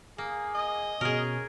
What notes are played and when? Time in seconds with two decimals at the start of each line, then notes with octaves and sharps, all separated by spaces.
0.18 A#3 G#4
0.55 D#5
1.01 B2 C#4 G#4 A#4 F6